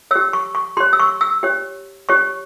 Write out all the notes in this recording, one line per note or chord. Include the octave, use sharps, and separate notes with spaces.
G4 C#5 E6
C#6
C#6
G4 C#5 C6
E6
C#6
E6
G4 C#5
G4 C#5 C#6